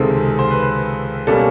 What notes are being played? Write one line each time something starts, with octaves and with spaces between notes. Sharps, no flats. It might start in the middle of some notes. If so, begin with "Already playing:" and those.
Already playing: C#2 C3 D#3 G#3 C4 A4
C5
B4
B2 G3 A#3 C#4 A4